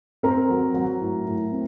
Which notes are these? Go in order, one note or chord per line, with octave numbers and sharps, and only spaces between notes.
C4 A#4 A#5
F#3
F#3
A2
A2
C4